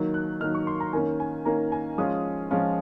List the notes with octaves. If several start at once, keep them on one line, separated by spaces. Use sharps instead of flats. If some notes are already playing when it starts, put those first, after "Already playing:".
Already playing: D#3 F#3 A#3 D#4
F#6
D#3 F#3 A#3 D#4 F6
C#6
C6
A#5
D#3 A#3 C#4 G#5
G#5
D#3 A#3 C#4 A#5
G#5
F3 G#3 C#4 F4 D#6
F3 G#3 C#4 F4